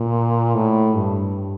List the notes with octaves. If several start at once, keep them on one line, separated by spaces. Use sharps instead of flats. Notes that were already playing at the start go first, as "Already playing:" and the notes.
Already playing: A#2
A2
G2